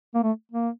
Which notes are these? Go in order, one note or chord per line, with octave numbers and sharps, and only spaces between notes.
A#3
A3
A#3